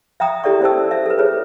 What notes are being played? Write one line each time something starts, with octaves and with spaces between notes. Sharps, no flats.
E5 G5 A#5 D#6
E4 G4 A4 D5 E5 C#6
C#4 G4 C5 D#5 A5 E6
E5
A4 B4
F4 G#4 B4 C#5